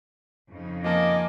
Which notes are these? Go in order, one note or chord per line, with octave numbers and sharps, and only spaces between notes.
F2 C#3 D#4
F3 A#3 D#5 G#5 A5 D6